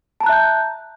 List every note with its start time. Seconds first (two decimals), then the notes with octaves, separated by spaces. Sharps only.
0.20 A5
0.23 A#5
0.26 F#6
0.29 E5
0.32 G6